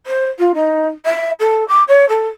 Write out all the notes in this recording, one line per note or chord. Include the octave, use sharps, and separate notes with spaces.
C5
F4
D#4
E5
A4
D6
C#5
A4